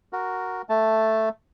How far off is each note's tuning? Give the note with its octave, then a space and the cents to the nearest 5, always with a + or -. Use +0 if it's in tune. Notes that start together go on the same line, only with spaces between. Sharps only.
F#4 +0 A#4 +0
A3 +5 A5 +0